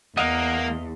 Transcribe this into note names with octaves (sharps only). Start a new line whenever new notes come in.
E2 A#3 D#5 F5 F#5